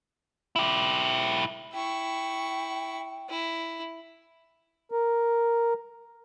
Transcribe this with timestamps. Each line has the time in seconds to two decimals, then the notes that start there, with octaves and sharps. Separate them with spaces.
0.56 E4 G4
1.73 E4 G5 C#6
3.30 E4
4.91 A#4